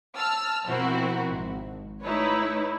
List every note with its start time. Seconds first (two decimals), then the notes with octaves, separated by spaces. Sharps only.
0.17 A5 E6 F6
0.66 B2 F3 C4 E4 F#4 A#4
1.31 G#1
2.02 A3 D#4 E4 B4 C#5